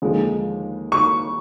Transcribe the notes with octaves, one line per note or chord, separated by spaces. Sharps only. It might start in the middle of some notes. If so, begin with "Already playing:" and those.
D#2 D3 F3 G#3
C#6